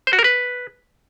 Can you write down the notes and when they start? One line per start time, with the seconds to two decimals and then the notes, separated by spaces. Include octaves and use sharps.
0.07 C5
0.13 F#4
0.19 A#4
0.24 B4